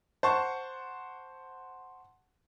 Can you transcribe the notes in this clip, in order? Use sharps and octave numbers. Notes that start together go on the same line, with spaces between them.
C5 F#5 A5 C#6